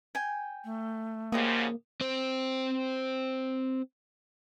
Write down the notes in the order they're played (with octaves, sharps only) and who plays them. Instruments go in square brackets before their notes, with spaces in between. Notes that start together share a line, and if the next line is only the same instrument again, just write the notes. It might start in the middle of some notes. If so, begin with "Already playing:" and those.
[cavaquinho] G5 G#5
[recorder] A3
[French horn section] G#2 C#3 F3 [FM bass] A#3 [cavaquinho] G4 D#5 D#6
[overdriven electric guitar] C4 C5